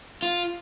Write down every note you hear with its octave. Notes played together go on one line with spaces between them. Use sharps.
F4